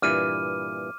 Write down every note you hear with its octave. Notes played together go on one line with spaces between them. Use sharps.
G2 A#2 E3 D6 F6 D#7